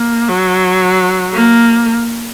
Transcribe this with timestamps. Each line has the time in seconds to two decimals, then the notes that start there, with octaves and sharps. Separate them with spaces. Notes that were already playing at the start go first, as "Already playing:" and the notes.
Already playing: A#3
0.29 F#3
1.34 A#3